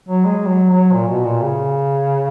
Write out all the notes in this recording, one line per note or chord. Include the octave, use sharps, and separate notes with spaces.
F#3
G#3
F#3
F#3
A#2
B2
A#2
C#3